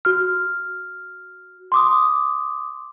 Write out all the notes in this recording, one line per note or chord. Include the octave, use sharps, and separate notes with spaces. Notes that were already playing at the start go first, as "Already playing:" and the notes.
F#4 F6
C6 D6 D#6